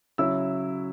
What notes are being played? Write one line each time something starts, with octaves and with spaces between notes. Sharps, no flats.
C#3 F#3 C#4 E4 E6